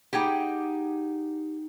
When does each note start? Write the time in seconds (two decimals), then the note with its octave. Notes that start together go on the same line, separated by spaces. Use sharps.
0.13 D#4 G4 G#4 D#5 F#5 G5